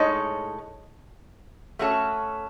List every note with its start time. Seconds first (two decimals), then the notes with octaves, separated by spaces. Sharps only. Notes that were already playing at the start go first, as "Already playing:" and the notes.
Already playing: A2 G#3 D#4 A4 C#5
1.79 A3 C#4 F#4 A4 C#5